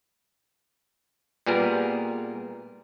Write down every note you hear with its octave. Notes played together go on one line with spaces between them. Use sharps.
A#2 G3 B3 G#4 A#4